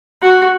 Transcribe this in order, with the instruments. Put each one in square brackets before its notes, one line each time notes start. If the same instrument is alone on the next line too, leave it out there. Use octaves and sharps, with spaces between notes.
[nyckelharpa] F#4